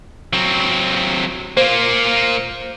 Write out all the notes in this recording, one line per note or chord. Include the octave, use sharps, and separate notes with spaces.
F#3 C4
A#3 F4 C5